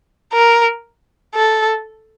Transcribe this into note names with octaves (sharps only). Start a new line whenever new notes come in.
A#4
A4